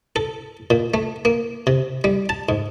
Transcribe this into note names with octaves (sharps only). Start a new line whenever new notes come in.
A4
A#2
A3
A#3
C3
G3
A5
G#2